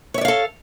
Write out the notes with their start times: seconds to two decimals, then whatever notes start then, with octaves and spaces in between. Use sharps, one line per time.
0.14 C#5
0.18 E5
0.21 D5
0.25 F5
0.28 A4